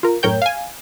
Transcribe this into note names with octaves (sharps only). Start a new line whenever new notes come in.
F4 A#4
F#2 A2 A#4 C#5 G5 G6
F5 G#5